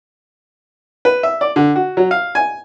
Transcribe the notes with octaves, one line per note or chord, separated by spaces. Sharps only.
B4
E5
D5
D3
F#4
F#3
F5
G#5